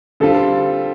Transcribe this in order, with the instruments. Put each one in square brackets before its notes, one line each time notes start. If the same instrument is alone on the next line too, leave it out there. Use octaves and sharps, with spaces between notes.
[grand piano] D3 G3 C4 F4 [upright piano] A4